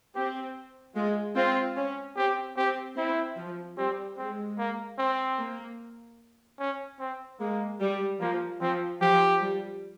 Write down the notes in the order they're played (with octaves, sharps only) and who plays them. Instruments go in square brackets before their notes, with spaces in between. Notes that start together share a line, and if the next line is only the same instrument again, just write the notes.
[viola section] C4 [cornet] G4
[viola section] G#3 [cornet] F4
[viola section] C4 [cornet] F4
[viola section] C#4
[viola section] C4 [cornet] G4
[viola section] C4 [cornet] G4
[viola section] C4 [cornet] E4
[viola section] F3
[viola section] G3 [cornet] C4
[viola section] G#3 [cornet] C4
[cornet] A#3
C4
[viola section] A#3
[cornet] C#4
C4
[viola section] G#3 [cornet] A#3
[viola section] G3
[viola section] F3 [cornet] A#3
[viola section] F3 [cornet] C4
[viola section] F3 [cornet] G4
[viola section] G3